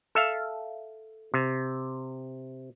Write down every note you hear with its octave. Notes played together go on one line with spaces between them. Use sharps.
A4 E5 F5
C3